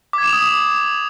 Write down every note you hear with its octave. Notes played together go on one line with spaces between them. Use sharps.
D6 D#6 G#6 E7 F7